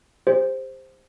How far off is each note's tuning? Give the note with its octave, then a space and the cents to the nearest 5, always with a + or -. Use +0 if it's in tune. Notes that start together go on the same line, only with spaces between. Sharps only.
G4 +40 C5 +0